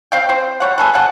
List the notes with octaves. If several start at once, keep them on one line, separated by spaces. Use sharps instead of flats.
C4 F5 G5
C4 C5
G3 C#5 F#5
G#4 A4 B4
C3 G#4 F#5 A5